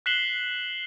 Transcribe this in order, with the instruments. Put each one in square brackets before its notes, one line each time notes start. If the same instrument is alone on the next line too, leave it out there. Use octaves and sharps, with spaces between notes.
[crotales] F#6 B6 C7 E7 F#7 G7